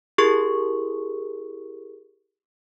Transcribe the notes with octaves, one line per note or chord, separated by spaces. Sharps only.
E4 G4 G#4 A#4 C#6